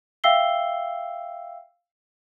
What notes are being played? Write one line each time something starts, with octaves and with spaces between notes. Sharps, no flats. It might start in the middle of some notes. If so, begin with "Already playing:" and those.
E5 F5 G5 E6 C7 G7